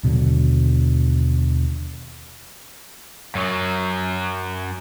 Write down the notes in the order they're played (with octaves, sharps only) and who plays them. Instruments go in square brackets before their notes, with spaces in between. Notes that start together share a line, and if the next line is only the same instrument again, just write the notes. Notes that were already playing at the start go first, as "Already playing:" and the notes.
[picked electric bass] D#2 B2 D3 F#3
[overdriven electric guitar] F#2 F#3